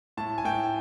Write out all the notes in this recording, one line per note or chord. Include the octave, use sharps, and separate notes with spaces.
A2 A5
G#5
A2 G5